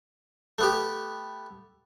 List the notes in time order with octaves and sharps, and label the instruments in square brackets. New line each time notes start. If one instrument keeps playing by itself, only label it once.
[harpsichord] A3 B3 G4